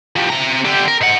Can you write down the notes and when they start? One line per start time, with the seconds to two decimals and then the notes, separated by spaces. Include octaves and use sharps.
0.16 F3 G3
0.30 C3 A#5
0.65 D3 G4
0.88 A#4
1.01 G#2 F#5